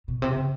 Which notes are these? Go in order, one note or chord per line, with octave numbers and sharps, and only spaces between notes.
B2
C3
C#3